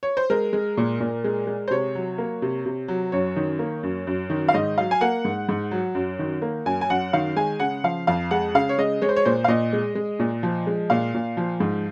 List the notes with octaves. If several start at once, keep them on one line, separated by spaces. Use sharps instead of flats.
C#5
C5
G#3 A#4
G#3
A#2
A#2
G#3
G#3
C5
C3 C#5
F#3
A#3
C3
C3
F#3
F#2 C#5
D#3
A#3
F#2
F#2
D#3
F5
G#2 D#5
F#3 F5
G#5
A#3 F#5
G#2
G#2
F#3
F#2
D#3
A#3
F#2 G#5
G#5
F#2 F#5
D#3 F5
G#3 G#5
C#3 F#5
F3 F5
F2 F5
G#3 F#5
C#3 F5
C#5
G#3 D#5
G#3 C#5
C5
C#5
A#2 C5
F5
A#2 D#5
G#3
G#3
A#2
F3
G#3
A#2 F5
A#2
F3
G#2